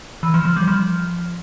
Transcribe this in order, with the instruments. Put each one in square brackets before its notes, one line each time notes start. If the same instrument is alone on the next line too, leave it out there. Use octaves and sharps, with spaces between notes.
[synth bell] E3
F3
F3
G3
F3